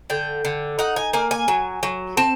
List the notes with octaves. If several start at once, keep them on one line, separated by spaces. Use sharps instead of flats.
D3 G5
D3
D#4 F#5
G#5
A#3 G#5
G#5
F#3
F#3
C4 A5